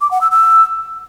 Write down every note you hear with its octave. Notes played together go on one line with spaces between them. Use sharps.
D6
F#5
E6
E6